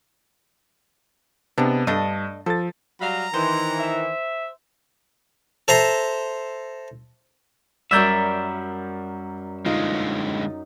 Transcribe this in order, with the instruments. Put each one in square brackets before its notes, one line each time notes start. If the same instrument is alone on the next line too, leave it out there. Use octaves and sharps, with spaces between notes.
[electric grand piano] C3 B3 [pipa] G#3 D4
[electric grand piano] G2 [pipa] A3 D4 D#5
[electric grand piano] F3 A6 [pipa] A4
[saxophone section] F#3 G3 F5 [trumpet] A#5
[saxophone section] D#3 E3 [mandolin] C5
[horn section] E5
[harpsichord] A4 C5 E5 A#5 C6
[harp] F#2 G3 [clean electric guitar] A#4 D5 E5 [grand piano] E6 G6
[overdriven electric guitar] D3 G#3 [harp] D#4 [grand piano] F4